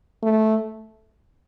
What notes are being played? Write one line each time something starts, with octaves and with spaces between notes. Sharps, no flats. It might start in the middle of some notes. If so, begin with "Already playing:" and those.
A3